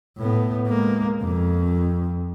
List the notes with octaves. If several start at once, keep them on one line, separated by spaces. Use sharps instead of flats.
A2 B3
G#3 A#3
F2